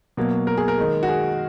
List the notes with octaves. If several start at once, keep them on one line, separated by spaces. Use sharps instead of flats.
B2 F#3 A#3
A#4
G#4
A#4
D#3 G#3
F#4
G#4